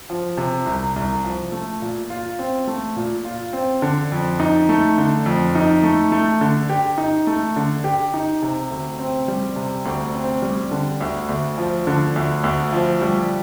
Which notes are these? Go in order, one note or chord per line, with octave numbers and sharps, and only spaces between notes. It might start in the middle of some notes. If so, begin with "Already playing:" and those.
F3
C3
C2
C2
F3
A3
A#2
F4
C4
A3
A#2
F4
C4
D3
F2
D#4
A3
D3
F2
D#4
A3
A3
D3
G4
D#4
A3
D3
G4
D#4
C3
D2
C4
G3
C3
D2
C4
G3
D3
D2
D2
F3
D3
D2
D2
F3
G3